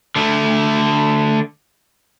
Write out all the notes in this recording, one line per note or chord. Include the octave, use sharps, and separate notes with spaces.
D3 A3